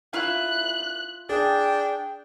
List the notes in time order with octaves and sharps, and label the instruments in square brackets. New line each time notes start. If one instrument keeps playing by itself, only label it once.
[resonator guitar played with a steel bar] E4 F4 E5 [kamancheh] F#6
[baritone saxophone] D4 [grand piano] G#4 [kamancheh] G5